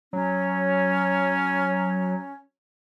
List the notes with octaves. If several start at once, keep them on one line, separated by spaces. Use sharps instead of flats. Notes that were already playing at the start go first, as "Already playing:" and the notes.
F#3 C#4